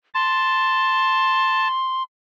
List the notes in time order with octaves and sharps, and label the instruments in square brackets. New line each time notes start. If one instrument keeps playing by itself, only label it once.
[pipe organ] A5 [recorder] C6